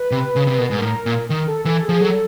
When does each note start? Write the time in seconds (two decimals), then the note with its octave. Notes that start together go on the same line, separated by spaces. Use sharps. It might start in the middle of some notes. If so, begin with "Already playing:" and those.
Already playing: B4
0.11 C3
0.36 C#3
0.47 C3
0.58 B2 A#4
0.68 G#2 B4
0.77 A#4
0.82 A2
1.06 A#2
1.29 D#3 A#4
1.47 A4
1.65 E3 A4
1.82 G#4
1.89 F3
2.01 F#3 A4